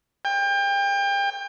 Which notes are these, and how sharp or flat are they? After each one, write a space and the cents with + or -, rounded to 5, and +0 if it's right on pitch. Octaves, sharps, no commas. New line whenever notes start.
G5 +30